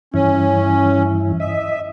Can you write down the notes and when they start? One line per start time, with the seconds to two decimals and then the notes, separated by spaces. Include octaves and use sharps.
0.14 G2 E3 C#4 E4
1.40 D#5 E5